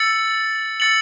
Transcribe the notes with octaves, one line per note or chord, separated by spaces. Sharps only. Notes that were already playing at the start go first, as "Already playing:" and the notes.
Already playing: E6 A6 C#7 F#7
E6 A6 C#7 F#7